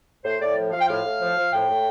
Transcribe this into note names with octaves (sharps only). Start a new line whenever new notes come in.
A2 C5
A2 D5
F3
F3 F5
G5
A2 F5
A2
F3
F3
A2 G5
A2